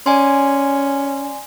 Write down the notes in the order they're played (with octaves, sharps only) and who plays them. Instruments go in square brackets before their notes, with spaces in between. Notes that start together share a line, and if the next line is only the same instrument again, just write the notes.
[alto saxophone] C#4 [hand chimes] D5 G#5 C6